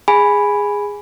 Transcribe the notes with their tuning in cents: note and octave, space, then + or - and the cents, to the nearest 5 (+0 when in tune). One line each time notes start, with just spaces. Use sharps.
G#4 -15 G#5 +0 B5 +0